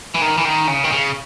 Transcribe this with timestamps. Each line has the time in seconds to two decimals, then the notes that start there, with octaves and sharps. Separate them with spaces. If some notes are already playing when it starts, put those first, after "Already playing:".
0.15 E3
0.22 D#3
0.38 E3
0.45 D#3
0.68 C#3
0.84 D#3
0.92 C#3